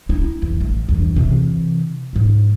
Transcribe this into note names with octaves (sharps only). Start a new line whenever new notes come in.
D#4 E4
E2
A1 A2
E2 G2
C3 E3
G#2 F3